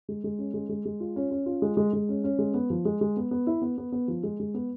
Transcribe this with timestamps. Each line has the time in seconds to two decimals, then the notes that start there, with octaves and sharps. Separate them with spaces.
0.09 G#3
0.24 G#3
0.39 C#4
0.54 G#3
0.69 G#3
0.85 G#3
1.00 F4
1.16 C#4
1.31 C#4
1.46 F4
1.62 G#3
1.77 G#3
1.93 G#3
2.09 C#4
2.24 C#4
2.39 G#3
2.54 B3
2.70 F3
2.85 G#3
3.01 G#3
3.17 B3
3.31 B3
3.47 E4
3.62 B3
3.78 B3
3.92 B3
4.08 F3
4.23 G#3
4.40 G#3
4.54 B3